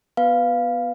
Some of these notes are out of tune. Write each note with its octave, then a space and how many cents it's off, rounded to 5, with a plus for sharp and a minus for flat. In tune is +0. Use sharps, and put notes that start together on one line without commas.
B3 +0 B4 +0 F5 +0